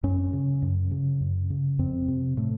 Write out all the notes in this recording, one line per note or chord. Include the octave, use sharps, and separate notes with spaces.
F#2 C#4
C#3
F#2
C#3
F#2
C#3
F2 C4
C3
A2 A3